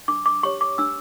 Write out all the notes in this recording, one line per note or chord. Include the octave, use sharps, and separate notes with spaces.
D4 D6
D6
G4 C#5 C#6
D6
D4 E6